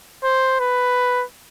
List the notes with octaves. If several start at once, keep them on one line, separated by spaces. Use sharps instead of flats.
C5
B4